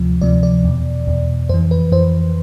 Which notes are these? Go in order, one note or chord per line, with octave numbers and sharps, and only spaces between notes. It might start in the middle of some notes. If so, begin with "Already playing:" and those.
Already playing: D2 C3 F3
D2 C3 F3 D5
D5
E2 B2
E2 B2
F2 E3 C5
B4
F2 E3 C5